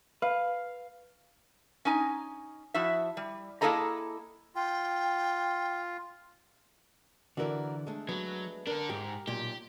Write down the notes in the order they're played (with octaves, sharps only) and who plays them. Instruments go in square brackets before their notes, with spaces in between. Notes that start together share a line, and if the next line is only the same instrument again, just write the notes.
[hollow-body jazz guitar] B4 [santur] F5
[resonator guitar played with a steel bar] C#4 D#4 G#5
F3 E4 F#4 E5
G3
A#3 E4 G#4 A4 D#5 A#5
[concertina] F4 [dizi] G5
[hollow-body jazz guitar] D3 E3 [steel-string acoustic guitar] F#4 A#4 D5
[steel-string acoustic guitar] G#3 A3 D4
[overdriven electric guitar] F#3 [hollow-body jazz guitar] B3
[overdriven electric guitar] D4 A4 [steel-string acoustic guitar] A#4
[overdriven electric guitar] G#2 [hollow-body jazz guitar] G4
[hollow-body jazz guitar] B1 A#2 [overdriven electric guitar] G4